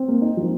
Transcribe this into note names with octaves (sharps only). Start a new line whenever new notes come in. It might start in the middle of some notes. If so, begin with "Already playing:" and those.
Already playing: C4
A#3
D#4
F3